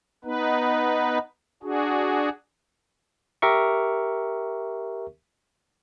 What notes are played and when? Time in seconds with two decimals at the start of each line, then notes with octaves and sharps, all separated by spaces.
0.25 B3 D#4 B4
1.63 D4 F#4 G#4
3.42 G4 A#4 E5 C#6